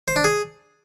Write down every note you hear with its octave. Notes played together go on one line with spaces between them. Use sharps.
C5
D4
G#4